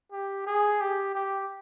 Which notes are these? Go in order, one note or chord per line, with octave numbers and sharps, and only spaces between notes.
G4
G#4
G4
G4